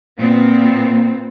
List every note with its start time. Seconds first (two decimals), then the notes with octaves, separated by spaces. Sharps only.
0.19 A#2 B3 C4